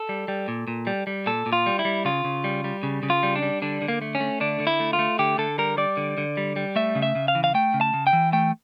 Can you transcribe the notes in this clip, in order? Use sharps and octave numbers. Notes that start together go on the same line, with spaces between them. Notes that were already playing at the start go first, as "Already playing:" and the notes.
Already playing: A4
G3
G3
A#2
A#2
G3
G3
A#2 A4
A#2
F4
G3
E4
G3
C#3 F4
C#3
G3
G3
C#3
C#3
F4
G3
D4
G3
D3 D4
D3
A#3
A3
C#4
A3
D3 D4
D3
E4
A3
F4
A3
D3 G4
D3 A4
G3 A#4
G3 D5
D3
D3
G3
G3
A3 E5
C#3
E5
C#3
F5
E3
F5
A3 G5
C#3
A5
C#3
G5
E3
A3 G5